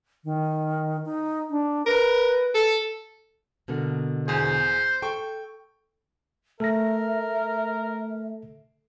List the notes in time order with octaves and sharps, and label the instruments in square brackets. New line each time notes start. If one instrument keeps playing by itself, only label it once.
[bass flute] D#3
D#4
D4
[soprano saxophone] A#4 [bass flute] B4
[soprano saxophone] A4
[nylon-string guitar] B2 D3 A#3
[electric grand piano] E2 G#4 [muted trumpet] C5
[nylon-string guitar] A4 [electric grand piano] G5 C#6
[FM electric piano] A3 [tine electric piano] A4 A#6 [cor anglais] A#4 [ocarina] E5